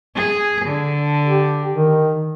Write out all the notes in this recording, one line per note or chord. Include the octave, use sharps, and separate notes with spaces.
G#4
D3
G4
D#3